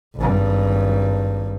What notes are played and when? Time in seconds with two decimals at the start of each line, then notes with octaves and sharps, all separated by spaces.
0.15 G#1 G2